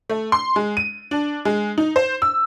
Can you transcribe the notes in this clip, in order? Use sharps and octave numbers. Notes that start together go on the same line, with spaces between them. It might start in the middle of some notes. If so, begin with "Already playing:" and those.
A3
C6
G#3
D#7
D4
G#3
D#4
C5
E6